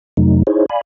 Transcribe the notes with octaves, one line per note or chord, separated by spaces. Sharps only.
F2 C3 F#3 A3 D#4
D#4 E4 G#4 C5 C#5
D5 F5 G#5 B5